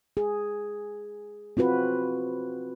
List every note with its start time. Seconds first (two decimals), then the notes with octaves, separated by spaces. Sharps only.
0.17 G#4
1.57 C4 F4 F#4 B4